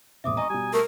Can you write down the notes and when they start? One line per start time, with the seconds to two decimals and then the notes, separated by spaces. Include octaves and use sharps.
0.24 E1 A#1 C4 E5 D6 D#6
0.37 D#5 G#5 A#5 C#6 D#6
0.50 B2 G3 G#5
0.73 A3 A#4